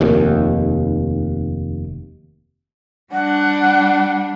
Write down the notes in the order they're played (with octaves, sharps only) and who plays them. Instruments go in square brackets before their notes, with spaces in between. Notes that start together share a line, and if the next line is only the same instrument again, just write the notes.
[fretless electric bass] F1 D#2
[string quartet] G3 D4 [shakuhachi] F#5